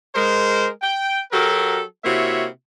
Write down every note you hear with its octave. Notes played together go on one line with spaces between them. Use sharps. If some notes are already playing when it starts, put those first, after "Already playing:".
G#3 A#4 C5
G5
F#3 F#4 G4 A4 A#4
C3 A#3 E4 F#4 C#5 E5